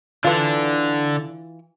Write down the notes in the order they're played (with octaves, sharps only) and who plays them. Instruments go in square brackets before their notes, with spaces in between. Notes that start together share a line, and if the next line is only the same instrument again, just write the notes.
[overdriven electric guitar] D3 D4 [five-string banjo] E3 F4